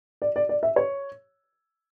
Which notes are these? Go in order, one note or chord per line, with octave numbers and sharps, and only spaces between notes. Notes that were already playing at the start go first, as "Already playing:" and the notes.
D5
D5
D5
E5
C#5